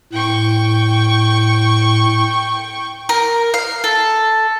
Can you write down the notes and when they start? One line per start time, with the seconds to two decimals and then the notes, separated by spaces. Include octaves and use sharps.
0.13 A2 G5 C#6
3.09 A#4
3.54 F5
3.84 A4